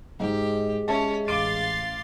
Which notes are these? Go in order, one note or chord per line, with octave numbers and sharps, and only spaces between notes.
G#2 G#3 G4
C#4 E5 A5
A1 F5 C6 D6 A6 D7